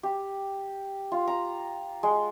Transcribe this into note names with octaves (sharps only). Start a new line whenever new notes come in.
G4
F4
A#5
G#3